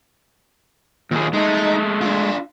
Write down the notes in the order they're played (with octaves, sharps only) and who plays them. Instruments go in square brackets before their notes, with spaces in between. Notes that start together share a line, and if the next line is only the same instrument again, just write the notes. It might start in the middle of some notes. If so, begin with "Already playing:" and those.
[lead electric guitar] D#2 [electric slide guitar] A#2 G#4
[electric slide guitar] G#3 A3 [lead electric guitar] D#4
[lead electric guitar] D4 F4